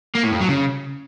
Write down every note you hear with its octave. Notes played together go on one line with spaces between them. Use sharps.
A#3
A2
F2
F#3
C#3